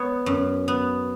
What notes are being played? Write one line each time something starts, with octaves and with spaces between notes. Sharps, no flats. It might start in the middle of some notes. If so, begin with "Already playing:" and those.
Already playing: B3 C#5
F#2
B3